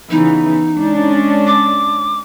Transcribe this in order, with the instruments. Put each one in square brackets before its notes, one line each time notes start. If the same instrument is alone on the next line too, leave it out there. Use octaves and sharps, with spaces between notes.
[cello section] C#3 E3 B3 [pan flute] D#4
[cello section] G#3 C#4 D4
[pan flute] D6